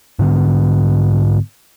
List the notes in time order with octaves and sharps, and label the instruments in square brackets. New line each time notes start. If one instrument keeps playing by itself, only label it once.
[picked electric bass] G#2 D3 B3